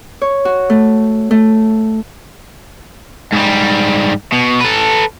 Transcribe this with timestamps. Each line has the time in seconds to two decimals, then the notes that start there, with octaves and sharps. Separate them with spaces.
0.22 C#5
0.45 F#4
0.70 A3
1.31 A3
3.33 G#2 G3
4.32 B2
4.61 A4 B4